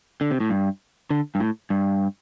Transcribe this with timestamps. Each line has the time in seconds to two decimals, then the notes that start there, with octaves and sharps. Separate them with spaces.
0.21 D3
0.31 C3
0.40 A2
0.50 G2
1.10 D3
1.35 G2
1.40 A2
1.70 G2